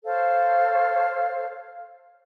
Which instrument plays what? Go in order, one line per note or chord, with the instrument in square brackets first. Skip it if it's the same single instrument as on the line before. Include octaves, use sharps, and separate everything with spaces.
[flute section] A4 C5 C#5 F5